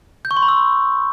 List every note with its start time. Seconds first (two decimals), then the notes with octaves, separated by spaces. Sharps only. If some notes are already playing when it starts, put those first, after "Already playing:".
0.25 G6
0.31 C#6
0.37 C6
0.42 B5
0.48 E6